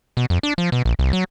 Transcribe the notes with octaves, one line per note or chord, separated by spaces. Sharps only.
B2
F2
D4
F3
B2
A#1
C2
F#3